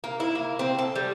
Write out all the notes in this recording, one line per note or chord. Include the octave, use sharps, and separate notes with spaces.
A#3
E4
A#3
C4
A4
G3